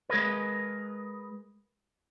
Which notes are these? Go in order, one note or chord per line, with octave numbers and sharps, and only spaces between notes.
G#3 G#4 A#4 B4